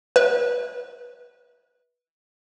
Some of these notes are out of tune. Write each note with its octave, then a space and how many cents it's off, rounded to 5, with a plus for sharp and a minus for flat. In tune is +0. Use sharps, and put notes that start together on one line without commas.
B4 -20 E5 -30